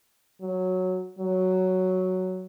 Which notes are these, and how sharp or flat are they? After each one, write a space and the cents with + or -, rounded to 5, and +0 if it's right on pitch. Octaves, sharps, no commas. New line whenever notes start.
F#3 -5
F#3 +5